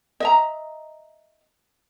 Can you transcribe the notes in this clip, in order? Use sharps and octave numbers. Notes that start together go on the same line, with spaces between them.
D#5 E5 A#5